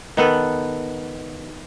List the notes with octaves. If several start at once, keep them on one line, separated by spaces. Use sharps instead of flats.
D#3 B3 A4 B4